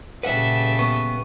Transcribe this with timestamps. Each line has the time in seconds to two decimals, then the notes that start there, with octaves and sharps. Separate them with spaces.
0.23 A#2 C#3 G3 A4 B4 E5 F#5
0.79 B3 C#6